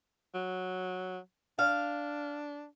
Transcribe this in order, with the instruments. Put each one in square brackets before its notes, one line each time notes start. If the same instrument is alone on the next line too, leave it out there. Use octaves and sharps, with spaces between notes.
[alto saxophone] F#3
[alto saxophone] D4 [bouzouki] F5